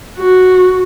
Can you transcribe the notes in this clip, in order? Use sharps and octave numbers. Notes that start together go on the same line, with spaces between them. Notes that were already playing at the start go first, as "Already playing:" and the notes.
F#4